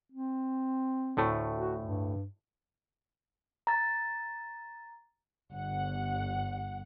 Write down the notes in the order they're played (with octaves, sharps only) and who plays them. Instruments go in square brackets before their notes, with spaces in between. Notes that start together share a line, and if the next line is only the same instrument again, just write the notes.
[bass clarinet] C4
[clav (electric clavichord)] D2 A2 A3
[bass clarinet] F#4
G2
[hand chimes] A#5 A6
[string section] G1 F#5